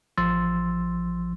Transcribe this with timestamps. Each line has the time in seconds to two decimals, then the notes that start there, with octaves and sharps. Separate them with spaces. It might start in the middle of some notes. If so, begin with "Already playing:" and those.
0.17 A1 F3 C6 E6 A6